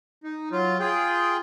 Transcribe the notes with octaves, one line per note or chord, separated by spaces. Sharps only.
D#4
F#3 F4
F4 G#4 G5